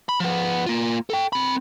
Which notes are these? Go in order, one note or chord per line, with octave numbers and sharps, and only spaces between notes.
B5
F3 B3
A#3 F4
A4 G5
C4 B5